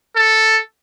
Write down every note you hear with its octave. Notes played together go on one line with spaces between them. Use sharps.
A4